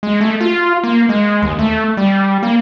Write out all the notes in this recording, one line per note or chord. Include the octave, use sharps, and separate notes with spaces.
G#3
A3
F4
A#3
G#3
D#2
A3
G3
A#3